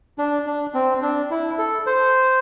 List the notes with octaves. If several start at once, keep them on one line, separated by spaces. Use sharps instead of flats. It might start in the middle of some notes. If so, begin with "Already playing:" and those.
D4
D4
C4
D4
E4
A4
C5